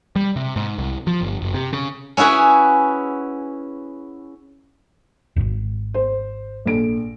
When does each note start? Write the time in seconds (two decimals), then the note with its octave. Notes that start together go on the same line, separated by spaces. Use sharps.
0.16 G3
0.36 C3
0.56 G#2
0.78 C2
1.07 F3
1.21 G1
1.41 F#1
1.54 C3
1.73 C#3
2.17 C#4 E4 F#4 G#4 B4
5.36 D#1 G#1
5.94 C5
6.66 A#1 A4 D7